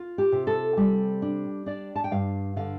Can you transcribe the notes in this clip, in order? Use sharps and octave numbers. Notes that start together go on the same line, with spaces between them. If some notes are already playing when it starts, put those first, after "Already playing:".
Already playing: F4
G4
C3
A4
G3
D4
D4 D5
A5
G5
G2 F5
D3 F5